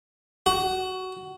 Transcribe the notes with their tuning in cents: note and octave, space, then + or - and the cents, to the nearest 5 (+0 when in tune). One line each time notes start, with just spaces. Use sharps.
F#4 +15